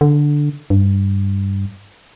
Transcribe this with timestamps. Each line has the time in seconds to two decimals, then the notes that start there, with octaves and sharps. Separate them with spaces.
0.01 D3
0.70 G2